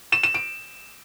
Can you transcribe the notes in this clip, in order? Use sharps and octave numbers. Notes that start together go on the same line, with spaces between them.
E7
E7
D7